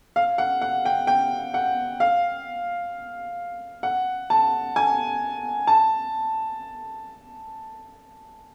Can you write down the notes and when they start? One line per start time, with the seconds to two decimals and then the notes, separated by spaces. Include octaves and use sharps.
0.16 F5
0.38 F#5
0.62 F#5
0.85 G5
1.07 G5
1.54 F#5
2.00 F5
3.83 F#5
4.30 A5
4.76 G#5
5.67 A5